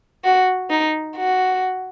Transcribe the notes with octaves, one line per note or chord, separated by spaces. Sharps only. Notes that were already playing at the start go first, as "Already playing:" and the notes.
F#4
D#4
F#4